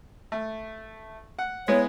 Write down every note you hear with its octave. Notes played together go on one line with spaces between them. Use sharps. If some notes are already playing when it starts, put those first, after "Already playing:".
A3
F#5
G#3 B3 E4 C#5